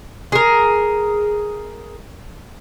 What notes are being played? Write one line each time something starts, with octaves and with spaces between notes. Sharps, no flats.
G#4 A#4